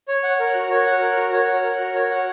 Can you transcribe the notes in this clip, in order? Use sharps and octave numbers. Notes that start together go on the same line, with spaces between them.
C#5
F#5
A#4
F#4
C#5
F#5
A#4
F#4
C#5
F#5
A#4
F#4
C#5
F#5